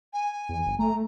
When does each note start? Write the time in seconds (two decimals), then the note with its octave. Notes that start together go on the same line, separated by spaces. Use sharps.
0.13 G#5
0.49 E2
0.66 G1
0.79 A3 A#5